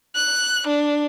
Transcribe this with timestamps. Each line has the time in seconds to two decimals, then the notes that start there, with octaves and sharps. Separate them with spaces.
0.16 F#6
0.67 D4